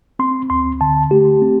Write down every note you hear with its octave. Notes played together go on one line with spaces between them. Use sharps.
C4 C6
D2 C6
D3 A5
A3 G4
C4